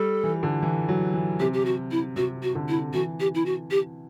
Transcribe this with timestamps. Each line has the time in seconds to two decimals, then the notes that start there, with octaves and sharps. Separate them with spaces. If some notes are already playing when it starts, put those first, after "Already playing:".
Already playing: G3 A4
0.23 E3
0.43 D3
0.62 E3
0.88 F#3
1.14 E3
1.40 C3 G4
1.54 G4
1.65 F#4
1.91 E4
2.16 C3 F#4
2.43 F#4
2.55 D3
2.69 E4
2.93 E3 F#4
3.20 G4
3.35 E4
3.46 F#4
3.71 G4